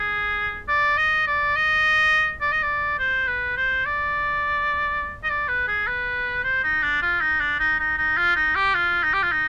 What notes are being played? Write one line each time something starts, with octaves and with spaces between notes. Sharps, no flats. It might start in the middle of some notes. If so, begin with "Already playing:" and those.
Already playing: G#4
D5
D#5
D5
D#5
D5
D#5
D5
C5
B4
C5
D5
D#5
D5
B4
G#4
B4
C5
D#4
D4
F4
D#4
D4
D#4
D#4
D#4
F4
D#4
G4
F4
D#4
G4
F4
D#4